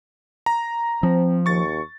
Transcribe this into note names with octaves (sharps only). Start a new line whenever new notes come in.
A#5
F3 C4
D#2 C#6 A6